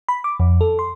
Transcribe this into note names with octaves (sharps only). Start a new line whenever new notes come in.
B5
D6
F2
A4
C6